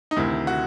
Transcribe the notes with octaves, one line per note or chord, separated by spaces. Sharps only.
D#4
D2 C3 D#3 E4
F#4